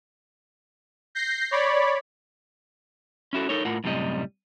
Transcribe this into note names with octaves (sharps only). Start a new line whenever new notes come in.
G6 A#6 C7
C#5 D5 B5
C#4 E4 F#4 A4
D#4 A4 A#4 C#5
A2 F4 A#4 F#5
F#2 A2 C3 G3 D#5